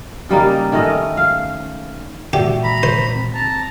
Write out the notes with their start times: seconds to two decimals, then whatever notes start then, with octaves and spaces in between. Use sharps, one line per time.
0.29 C#3 G3 A#3 D#4
0.72 D#3 A3 C#4 D#5
1.17 F5
2.33 A#2 E3 G#3 F#4 G4 D5 E5
2.63 A#5 B5
2.83 C5
3.16 C4
3.34 A5 A#5